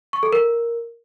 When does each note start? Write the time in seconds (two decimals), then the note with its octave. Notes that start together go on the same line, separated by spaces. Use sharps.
0.13 C#6
0.23 A4
0.33 A#4